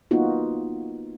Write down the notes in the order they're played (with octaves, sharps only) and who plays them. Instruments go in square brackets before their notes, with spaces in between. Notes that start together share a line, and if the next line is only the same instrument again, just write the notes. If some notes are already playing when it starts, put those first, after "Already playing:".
[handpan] A#3 B3 D#4 F4 F#4